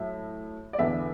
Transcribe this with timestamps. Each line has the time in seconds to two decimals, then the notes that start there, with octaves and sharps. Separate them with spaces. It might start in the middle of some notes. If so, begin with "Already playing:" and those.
Already playing: A2 F#3 E5
0.73 D5
0.78 E2 D3 B3 E5